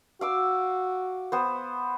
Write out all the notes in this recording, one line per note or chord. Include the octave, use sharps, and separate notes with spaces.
F#4 F5 D6 E6
B3 C5